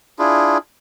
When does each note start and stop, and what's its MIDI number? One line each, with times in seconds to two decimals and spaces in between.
0.19 0.58 62
0.19 0.58 64
0.19 0.58 65
0.19 0.58 68